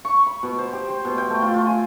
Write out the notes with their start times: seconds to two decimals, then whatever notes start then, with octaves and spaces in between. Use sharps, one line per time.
0.05 C#6
0.27 B5
0.43 B2
0.59 C5
0.73 G4
0.89 C5
1.05 B2
1.18 G5
1.30 A3
1.42 F4
1.54 F4
1.67 G#5